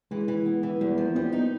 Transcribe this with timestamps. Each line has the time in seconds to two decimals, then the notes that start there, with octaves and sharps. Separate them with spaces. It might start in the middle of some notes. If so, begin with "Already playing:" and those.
0.11 E3 G#3
0.28 E3
0.46 B3
0.63 E3
0.81 E2 G3
0.92 G#3
0.98 F3
1.04 A#3
1.16 G3 B3
1.27 B3
1.33 D#4
1.39 A#3